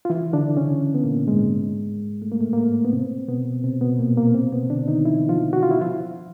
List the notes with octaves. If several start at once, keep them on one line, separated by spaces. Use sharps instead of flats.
F4
E3 E4
D3 D4
C#3 C#4
B3
A#2 A#3
G#2 G#3
A3
A#3
A2 A3
A#3
A2 A3
B3
C3 C4
B2 B3
C3 C4
B2 B3
A#2 A#3
A#2 A#3
C3 C4
B2 B3
D3 D4
D#3 D#4
E3 E4
F3 F4
F#4
F4
E4
F3 F4